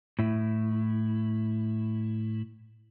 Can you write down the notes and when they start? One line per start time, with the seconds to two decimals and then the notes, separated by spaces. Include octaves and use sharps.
0.19 A2 E4